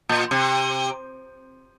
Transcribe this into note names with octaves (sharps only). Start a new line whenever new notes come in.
A#2
C3